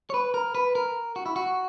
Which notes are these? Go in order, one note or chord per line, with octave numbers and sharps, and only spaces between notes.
C#5
B4
A#4
B4
A#4
F#4
E4
F#4